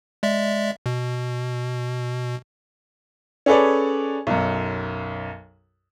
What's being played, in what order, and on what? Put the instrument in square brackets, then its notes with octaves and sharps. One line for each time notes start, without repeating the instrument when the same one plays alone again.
[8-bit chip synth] G#3 D5 E5
B2
[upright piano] C#4 G#4 A4 B4 C#5 D5
B1 F#2